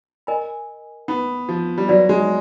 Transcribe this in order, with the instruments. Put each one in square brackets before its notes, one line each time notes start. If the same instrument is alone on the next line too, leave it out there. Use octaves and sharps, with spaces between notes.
[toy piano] A#4 D#5 G#5 B5
[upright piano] B3
F3
G3
[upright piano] F#3 [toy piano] F#4 B4 D5
[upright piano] G#3